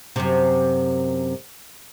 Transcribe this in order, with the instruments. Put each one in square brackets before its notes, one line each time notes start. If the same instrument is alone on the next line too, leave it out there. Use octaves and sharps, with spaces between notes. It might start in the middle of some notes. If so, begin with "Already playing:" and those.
[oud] F#2 C3